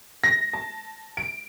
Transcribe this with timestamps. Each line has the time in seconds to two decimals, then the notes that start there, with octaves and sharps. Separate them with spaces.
0.24 A#6
0.53 A5
1.17 D7